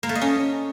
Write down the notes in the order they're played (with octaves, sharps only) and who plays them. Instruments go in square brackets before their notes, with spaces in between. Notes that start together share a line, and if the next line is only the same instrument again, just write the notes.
[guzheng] A#3
A3
D#5
C#4